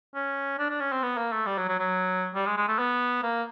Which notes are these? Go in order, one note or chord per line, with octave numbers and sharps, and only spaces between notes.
C#4
D4
D4
C#4
C4
B3
A#3
A3
G3
F#3
F#3
F#3
G3
G#3
G#3
A3
B3
A#3